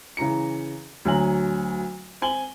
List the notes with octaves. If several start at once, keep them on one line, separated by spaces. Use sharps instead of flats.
C#3 E3 A#5 C#7
D2 F#3 G#5 A#5 F#7
C4 G#5 F#7 G7